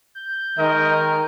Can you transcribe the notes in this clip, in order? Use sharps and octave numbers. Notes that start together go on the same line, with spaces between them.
G6
D#3 G#3 A#4 D#5